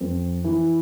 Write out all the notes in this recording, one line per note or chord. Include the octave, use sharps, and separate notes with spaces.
F2
E3